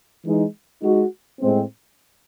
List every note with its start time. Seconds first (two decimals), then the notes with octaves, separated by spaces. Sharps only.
0.23 E3 G#3 D#4
0.82 G#3 D#4 F#4
1.41 A2 G#3 C4